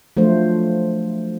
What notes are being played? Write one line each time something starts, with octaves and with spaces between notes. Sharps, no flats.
F3 F#3 A3 D4 F4 C5